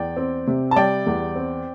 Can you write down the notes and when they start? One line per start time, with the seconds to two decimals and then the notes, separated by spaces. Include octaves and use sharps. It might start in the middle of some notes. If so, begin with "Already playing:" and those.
Already playing: E2 D5 G5
0.17 C4
0.47 C3
0.71 A5
0.76 G3 D5 G5
1.07 E2
1.35 C4